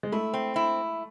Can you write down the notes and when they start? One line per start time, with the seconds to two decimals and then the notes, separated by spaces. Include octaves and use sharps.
0.03 G#3
0.12 A3 E4
0.34 C4
0.56 E4